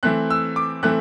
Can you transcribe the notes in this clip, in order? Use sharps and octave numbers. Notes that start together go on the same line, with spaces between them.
E3 A3 C4 F#6
E6
D6
E3 A3 C4 F#6